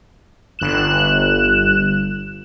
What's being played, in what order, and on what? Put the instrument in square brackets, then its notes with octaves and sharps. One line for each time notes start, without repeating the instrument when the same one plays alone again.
[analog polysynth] G1 F#6 E7